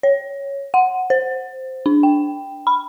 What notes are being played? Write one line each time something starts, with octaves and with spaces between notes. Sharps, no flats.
C#5
F#5
C5
D4
G5
B5